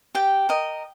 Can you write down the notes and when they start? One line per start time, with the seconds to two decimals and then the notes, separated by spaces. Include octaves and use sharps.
0.15 G4 G5
0.49 A#4 D#5